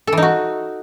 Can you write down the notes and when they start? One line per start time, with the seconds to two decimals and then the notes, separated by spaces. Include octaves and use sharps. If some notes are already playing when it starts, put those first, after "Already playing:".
0.07 A4
0.12 E3
0.17 D#4
0.22 F#4